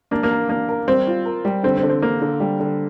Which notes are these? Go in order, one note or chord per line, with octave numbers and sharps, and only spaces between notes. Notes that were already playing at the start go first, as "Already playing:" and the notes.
A#3 D4
A#3
A#4
A#3 D4
A#4
G3 C4
F4
A#4
G3
D3 C4
C4
D3
C4
D3 A#3
D3
G3
D3